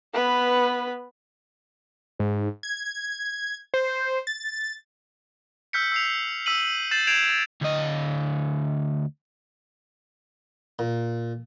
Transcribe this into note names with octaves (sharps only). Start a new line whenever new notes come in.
B3 B4
G#2
G#6
C5
A6
E6 F6 G6 B6 C#7
E6 C7 F7
E6 B6 D#7 F#7
G6 A6 C7 E7 F#7
G6 G#6 C7 D7 E7 F7
D2 D#5
A#2